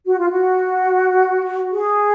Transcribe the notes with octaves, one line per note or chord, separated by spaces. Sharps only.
F#4
F4
F#4
G#4